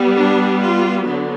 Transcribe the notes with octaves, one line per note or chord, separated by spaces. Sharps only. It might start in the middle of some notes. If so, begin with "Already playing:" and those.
Already playing: G3 B3
D4
F4
D3 F#3 B3